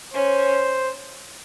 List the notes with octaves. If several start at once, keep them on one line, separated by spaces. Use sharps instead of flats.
C#4 C5